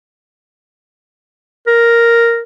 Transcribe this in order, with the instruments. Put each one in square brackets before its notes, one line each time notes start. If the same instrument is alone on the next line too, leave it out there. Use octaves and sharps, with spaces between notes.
[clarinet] A#4